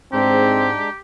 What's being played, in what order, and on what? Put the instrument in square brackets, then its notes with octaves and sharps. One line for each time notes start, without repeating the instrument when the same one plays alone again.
[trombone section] G#2 [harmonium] G#3 D4 A#5 [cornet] C4 [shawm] G4